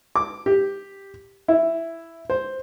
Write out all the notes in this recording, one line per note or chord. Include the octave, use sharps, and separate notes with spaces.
D6
G4
E4
C5